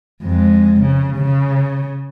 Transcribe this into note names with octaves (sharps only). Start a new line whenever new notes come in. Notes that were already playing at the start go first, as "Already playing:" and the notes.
F2 G#3
C#3
C#3